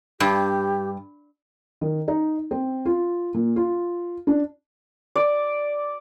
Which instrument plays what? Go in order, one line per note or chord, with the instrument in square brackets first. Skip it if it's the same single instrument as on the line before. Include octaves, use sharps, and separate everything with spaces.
[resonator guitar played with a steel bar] G2 [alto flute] G4
[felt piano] D#3
D#4
C4
F4
A#2
F4
D4
[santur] D5